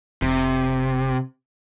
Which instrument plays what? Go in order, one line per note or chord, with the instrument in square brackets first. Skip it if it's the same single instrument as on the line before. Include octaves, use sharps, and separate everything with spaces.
[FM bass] F1 [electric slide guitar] C3